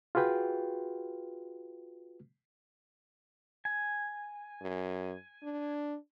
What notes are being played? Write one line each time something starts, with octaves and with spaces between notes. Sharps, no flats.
F4 F#4 G#4 B4 G5
G#5
F#2
D4